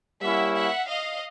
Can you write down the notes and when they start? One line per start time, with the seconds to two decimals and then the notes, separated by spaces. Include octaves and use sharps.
0.22 G3 A#3 C#4 E4 E5 F#5
0.56 E5 F#5
0.88 D#5 F5